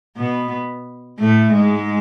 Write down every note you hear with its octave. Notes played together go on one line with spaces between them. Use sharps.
B2 B3
A2 A3
G#2 G#3